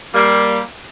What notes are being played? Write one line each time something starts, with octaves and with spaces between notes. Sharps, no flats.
G3 A#3